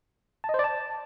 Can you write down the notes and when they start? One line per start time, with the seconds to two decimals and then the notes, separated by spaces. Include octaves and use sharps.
0.44 A5
0.49 D#5
0.54 C5
0.59 D5
0.64 A5